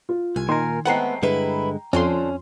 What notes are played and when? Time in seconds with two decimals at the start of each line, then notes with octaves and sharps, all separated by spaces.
0.09 F4
0.36 C2 G#5
0.49 A#2 D#3 A#4 C6
0.85 G#3 A3 B3 C4 F#5 G5 A#5 C7
1.22 G2 D3 G#3 E4 B4
1.93 F2 D3 F3 C#4 C6